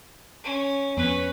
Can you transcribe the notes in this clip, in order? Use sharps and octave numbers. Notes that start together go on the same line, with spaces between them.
C#4
F2 B3 C#4 B4